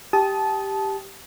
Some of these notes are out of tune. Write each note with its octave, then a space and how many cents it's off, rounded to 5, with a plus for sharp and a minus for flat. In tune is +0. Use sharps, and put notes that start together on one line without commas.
G4 +0 A5 -20 D#6 +15